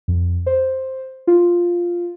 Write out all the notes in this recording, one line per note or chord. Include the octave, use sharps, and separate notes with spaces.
F2
C5
F4